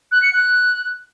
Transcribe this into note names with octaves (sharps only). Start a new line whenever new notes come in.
F#6
C#7
F#6